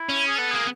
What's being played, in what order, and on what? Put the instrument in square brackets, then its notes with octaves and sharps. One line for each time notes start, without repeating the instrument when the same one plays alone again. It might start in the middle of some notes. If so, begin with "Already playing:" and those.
Already playing: [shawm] E4
[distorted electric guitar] C#4
[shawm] G#4
[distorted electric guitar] B3 [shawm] A4
[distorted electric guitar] A#3 [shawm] G#4